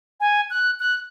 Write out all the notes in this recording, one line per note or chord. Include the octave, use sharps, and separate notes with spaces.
G#5
F#6
F#6